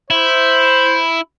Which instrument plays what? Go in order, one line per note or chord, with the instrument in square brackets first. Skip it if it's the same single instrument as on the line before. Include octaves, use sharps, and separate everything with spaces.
[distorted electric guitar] E4 [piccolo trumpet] C5